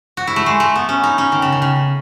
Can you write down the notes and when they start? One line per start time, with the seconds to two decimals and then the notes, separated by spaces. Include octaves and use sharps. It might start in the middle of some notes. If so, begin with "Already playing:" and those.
0.17 F#4
0.27 E4
0.36 A3
0.46 G#3
0.60 A3
0.76 B3
0.89 C#4
1.04 D#4
1.18 C#4
1.32 D#3
1.42 C#3
1.52 D#3
1.62 C#3